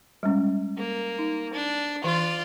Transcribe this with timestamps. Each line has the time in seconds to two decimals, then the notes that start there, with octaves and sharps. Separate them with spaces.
0.23 G3 G#3 C#4
0.77 A#3
1.19 D#4
1.53 D4
2.04 E3 F4 D5